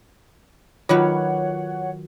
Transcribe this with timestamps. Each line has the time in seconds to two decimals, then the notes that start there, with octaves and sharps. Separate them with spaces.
0.89 D#3 F#3 F4 B4 C#5 F#5 D6